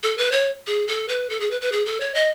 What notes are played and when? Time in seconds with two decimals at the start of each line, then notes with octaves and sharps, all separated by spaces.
0.03 A4
0.18 B4
0.32 C#5
0.67 G#4
0.88 A4
1.08 B4
1.30 A4
1.40 G#4
1.51 B4
1.61 B4
1.72 G#4
1.86 A4
2.00 C#5
2.15 D#5